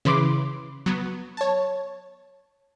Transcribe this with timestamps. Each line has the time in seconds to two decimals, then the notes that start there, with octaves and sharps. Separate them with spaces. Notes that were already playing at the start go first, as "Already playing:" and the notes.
0.05 C#3 E3 B5 C6 D6
0.86 F#3 B3
1.37 C#5 A5